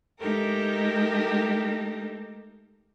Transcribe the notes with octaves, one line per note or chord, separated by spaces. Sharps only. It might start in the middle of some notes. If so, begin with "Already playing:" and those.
G#3 A3 D#4 G4 A4 A#4